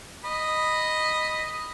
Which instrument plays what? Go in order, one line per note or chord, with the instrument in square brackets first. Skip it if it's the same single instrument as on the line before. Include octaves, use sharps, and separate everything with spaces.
[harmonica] D#5 B5